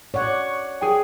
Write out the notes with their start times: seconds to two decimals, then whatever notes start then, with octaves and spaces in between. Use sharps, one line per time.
0.14 C#5 D5 F#5
0.81 G#4 G5